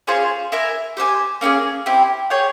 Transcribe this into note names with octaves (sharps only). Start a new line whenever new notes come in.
C#4 F4 G#4 C5
E4 A#4 E5 G#5
G4 C5 E5 G#5
A#3 C#4 E4 G#4
C4 E4 G4
G#4 C#5 G5